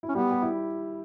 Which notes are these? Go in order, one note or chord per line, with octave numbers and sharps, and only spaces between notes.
E4
C#4
G3 B3 G4
G4
E4